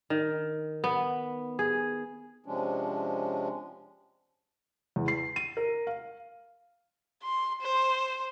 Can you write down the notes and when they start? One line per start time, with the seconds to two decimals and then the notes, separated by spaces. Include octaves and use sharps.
0.10 D#3
0.84 B3
1.59 G#4
2.46 C3 F3 G#3 C#4 D4
4.96 E2
5.08 C7
5.36 D#7
5.57 A#4
5.87 F5
7.23 C6
7.61 C5